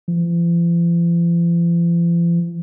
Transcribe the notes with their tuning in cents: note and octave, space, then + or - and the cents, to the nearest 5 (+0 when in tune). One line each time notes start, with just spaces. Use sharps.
F3 -45